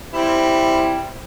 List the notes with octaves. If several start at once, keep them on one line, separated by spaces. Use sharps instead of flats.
G3 C4 E4